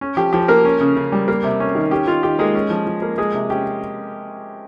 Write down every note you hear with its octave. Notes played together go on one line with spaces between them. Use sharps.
C#4
F3 G4
F3 G4
A#3 A#4
C#4
C#3
C#3
G3
A#3
C3
C#4
D#3
C#4 G4
D#3 F4
D#3 G4
G#3 A#3 G#4
C#4
F3
F3
A#3
G#3 A#3 G#4
C3
C#4 G4